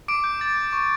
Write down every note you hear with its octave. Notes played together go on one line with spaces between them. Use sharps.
D6 D7
G6
D6 A6
G6
C#6